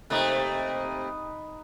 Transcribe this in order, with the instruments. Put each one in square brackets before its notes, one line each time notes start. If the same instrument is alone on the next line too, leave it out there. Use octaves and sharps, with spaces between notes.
[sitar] C3 A3 A#3 [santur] D#4 B4